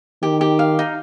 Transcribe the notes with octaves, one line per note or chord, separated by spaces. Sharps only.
D#3 G4
G4
F5
D#4